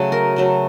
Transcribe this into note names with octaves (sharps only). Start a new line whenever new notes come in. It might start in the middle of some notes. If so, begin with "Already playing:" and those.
Already playing: C#3 F#3 A3
A#4
C#3 F#3 A3